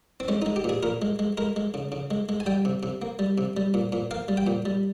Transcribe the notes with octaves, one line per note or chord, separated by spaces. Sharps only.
C4
G#3 C#4
G#3 D#4
G4
A#2 G#4
A#2 A#4
G#3
G#3
G#3 A#4
G#3
C#3
C#3
G#3
G#3
G#5
G3 G5
C3
C3
A#3
G3
C3
G3
A#2
A#2
A#3 F5
G3
G5
A#2
G3